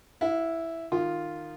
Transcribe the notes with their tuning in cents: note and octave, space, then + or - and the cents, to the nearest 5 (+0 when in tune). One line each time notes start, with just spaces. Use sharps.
E4 +0 F#5 -45
D#3 -15 F4 +0